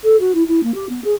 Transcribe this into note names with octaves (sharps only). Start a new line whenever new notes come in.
A4
F#4
E4
E4
A#3
G4
B3
G#4